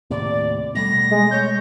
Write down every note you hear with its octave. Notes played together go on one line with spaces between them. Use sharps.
D#2 A2 C3 D5
B2 G3 A3 A#6
G#3
C#5 G6